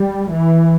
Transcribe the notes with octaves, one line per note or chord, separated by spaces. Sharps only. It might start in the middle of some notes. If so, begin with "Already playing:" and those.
Already playing: G3
E3